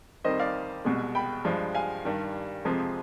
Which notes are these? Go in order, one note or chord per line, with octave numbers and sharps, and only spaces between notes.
F2 D#3 G3 C5 D#5
D5 F5
C2 B2 G#3
G5 B5
G2 F3 G#3
F5 G#5
G2 D#3 G3
F2 C3 F3 G#3